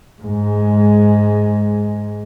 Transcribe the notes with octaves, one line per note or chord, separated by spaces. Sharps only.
G#2 G#3